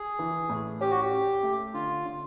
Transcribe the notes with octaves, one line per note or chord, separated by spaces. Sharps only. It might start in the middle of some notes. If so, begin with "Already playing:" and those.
Already playing: G#4
E3
A2
C#4 G4
F#4
G4
C#4
A3
D3 F4
D3